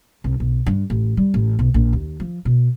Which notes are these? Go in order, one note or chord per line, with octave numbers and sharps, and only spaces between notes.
C2
B1
G2
A1
G3
A1
B1
A#1
D#2
F3
B2